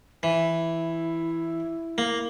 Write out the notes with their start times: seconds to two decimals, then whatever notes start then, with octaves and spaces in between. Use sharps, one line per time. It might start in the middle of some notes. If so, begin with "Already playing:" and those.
0.23 E3 E4
1.98 A#3